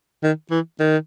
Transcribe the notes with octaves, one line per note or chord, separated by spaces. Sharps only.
D#3
E3
D#3